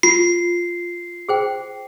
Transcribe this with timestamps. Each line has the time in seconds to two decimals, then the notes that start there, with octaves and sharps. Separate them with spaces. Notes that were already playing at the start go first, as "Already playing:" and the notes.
0.03 F4 C7
1.29 G#4 C5 G5